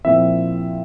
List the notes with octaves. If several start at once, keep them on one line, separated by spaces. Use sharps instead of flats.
A#2 F3 C4 E4 E5